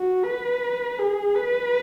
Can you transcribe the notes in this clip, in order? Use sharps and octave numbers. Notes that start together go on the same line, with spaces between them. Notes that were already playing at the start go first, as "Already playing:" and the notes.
Already playing: F#4
B4
G#4
B4